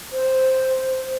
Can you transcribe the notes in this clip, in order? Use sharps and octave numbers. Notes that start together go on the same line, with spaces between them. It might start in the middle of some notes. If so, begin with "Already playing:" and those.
C5